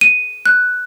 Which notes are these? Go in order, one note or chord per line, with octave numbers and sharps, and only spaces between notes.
D#7
F#6